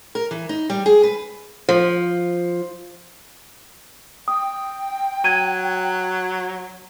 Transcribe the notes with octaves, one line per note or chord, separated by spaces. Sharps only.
A#4
E3
D#4
G3
G#4
B4
F3
G5 D#6
F#3 G#6 D#7